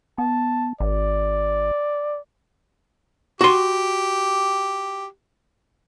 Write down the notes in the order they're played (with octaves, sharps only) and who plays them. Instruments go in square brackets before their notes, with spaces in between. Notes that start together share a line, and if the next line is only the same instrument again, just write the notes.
[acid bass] B3 [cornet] A5
[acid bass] G#1 [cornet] D5
[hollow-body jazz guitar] F#4 C6 [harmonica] G4